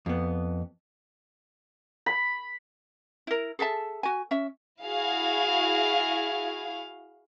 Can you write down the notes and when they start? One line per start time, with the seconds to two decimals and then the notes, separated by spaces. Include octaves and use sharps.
0.06 F2 B3
2.06 B5
3.27 E4 A#4
3.59 G#4 A4 E5 A5
4.03 F#4 G#5
4.31 C#4 E5
4.83 E4 F#4 G#4 F5